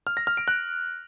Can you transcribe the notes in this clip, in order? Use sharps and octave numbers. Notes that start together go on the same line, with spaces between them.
F6
A#6
F6
D7
F#6